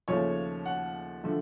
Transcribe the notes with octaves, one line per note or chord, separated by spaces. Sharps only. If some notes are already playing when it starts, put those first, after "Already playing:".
D#2 C#3 F3 A3 C#5
F#5
D3 F3 A3